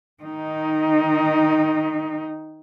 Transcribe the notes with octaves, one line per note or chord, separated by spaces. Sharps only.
D#3 D#4